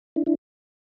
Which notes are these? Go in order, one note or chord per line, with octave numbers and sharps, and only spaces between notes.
D4 E4
D4 E4